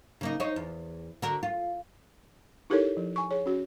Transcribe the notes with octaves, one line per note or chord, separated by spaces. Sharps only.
C#3 A#3 D#4
D#4 C5 C#5
E2
D3 F#4 A#4
F4
D#4 E4 G4 A4 A#4 C#5
F3
G#5 C#6
G#4 C#5
C#4 F#4